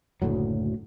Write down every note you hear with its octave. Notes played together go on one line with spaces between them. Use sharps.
F#1 D2 A2 F#3